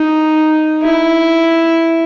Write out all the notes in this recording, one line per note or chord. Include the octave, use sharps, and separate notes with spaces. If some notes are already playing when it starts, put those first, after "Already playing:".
Already playing: D#4
E4